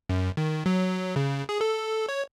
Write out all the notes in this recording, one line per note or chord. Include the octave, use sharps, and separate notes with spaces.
F#2
D#3
F#3
C#3
G#4
A4
C#5